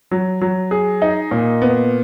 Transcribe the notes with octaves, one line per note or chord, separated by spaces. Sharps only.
F#3
F#3
G#4
D#4
A#2
B3